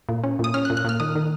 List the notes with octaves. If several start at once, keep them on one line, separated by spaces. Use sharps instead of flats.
A#2
C#4
A#2 D#6
C#4 F6
F#6
A#2
F#6
A#2 F6
D#3 D#6
D#3